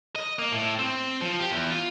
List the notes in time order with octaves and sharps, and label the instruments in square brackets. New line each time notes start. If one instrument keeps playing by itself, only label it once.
[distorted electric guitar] D#5
A#3
A2
C4
F3
G4
E2
F4